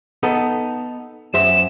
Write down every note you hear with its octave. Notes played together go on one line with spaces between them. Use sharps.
B3 D#4 A4
F#2 C5 E5 E7